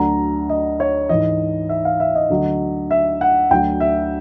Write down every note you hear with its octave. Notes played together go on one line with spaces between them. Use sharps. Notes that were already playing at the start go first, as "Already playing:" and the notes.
Already playing: D2 D3 F#3 A#5
D#5
C#5
G#2 E3 D#5
E5
F5
E5
D#5
D2 D3 F#3
E5
F#5
D2 D3 F#3 G5
E5